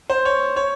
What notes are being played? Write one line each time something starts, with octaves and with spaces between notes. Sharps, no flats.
C5
C#5
C#5